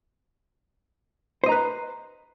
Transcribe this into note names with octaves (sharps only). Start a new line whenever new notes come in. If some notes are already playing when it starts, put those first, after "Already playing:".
B4 C5 D#5 A#5